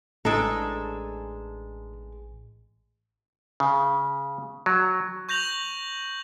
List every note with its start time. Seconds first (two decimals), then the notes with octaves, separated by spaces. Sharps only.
0.25 A1 A2 G#3 D4 A4 A#5
3.60 C#3
4.66 F#3
5.29 C#6 G6 A#6 F7 F#7